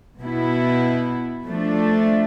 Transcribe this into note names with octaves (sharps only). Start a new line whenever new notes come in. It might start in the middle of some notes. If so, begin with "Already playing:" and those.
B2 B3 E4
F3 A3 D4